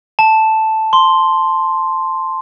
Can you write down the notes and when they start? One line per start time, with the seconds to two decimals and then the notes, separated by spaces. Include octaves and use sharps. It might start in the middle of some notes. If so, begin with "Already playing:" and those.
0.19 A5
0.93 C6